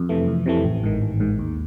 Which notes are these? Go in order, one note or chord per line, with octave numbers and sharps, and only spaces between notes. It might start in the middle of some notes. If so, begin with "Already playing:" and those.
Already playing: F2
C3 E3 A3
F2
C3 E3 A3
A1
G#2 D#3
A1
G#2 D#3
D#2